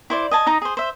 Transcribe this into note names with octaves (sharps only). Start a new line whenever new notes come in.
E4 C5 D5
D#5 G#5 A5
D#4 D#5 A#5
G#4 C5
C5 E5